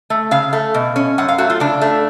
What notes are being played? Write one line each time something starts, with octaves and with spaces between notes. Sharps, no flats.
A3
C#3 F5
A3
B2
C#4
F#2 F#5
F5
A3 F#4
F4
C#3 D4
A3